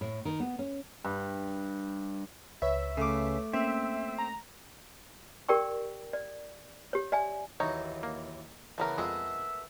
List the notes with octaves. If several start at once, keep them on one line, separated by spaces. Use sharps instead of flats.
A2
D#3
B3
C#4
G2
C#2 B4 C#5 E5
C#3 A3 D6
A#3 C4 C#4 E5
A#5
G4 A#4 D5 G5 C#6
D5
G4 C#5
D5 E5 G#5
D#2 E3 F#3 D#4 C#5
A#3
C#3 E3 A3 B3 A#4
F2 G#3 G#4 D#5 E5